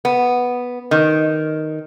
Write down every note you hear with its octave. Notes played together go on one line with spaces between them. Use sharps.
B3
D#3